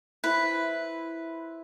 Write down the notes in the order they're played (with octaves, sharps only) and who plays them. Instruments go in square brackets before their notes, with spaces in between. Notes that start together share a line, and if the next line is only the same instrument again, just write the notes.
[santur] E4 C5 [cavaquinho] B4